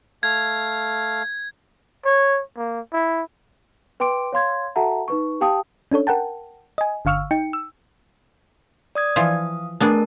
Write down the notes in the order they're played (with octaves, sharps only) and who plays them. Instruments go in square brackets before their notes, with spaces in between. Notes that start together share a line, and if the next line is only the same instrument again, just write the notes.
[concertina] A3 F5 [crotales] G#6
[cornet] C#5
A#3
E4
[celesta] B4 G5 C6 D6 D7
C#5 F5 C6 G#6
F#4 A4 E5 F#5 A5 A#5
D#4 B4 C#6
G4 F5 G5 A5 D#6
[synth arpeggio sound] C#4 D4 A4 C#5
A#4 F#5 G5 A5
D#5 G#5
G1 D3 F5 C#6 E6 F6
D#4 G5 C#7
E6
[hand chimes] D5 D#6 G#6
[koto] E3 F3 F4 [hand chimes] F5 D#6
[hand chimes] A3 A#4 A5 [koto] B3 D4 G#4